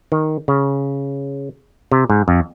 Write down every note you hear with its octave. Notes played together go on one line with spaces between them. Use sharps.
D#3
C#3
C3
G#2
F2